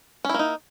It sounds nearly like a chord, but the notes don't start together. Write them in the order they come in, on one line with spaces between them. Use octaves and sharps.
C#4 E4 A#3 D#4